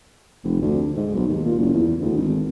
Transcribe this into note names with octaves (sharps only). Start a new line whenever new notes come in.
F1
D2
G#2
B1
D#2
A#2
F#1
E2
D2
G#1